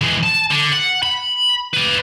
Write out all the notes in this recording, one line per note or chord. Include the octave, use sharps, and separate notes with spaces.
E3 G#3
A5
D3
F#5
B5
B4 D5